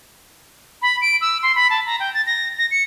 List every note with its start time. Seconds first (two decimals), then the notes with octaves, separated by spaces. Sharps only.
0.82 B5
1.01 D7
1.21 E6
1.43 C6
1.55 B5
1.70 A5
1.86 A#5
2.00 G5
2.14 A6
2.26 A#6
2.58 A#6
2.71 C#7